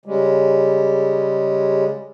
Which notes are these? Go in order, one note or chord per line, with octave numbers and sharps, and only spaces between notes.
C#3 G3 G#3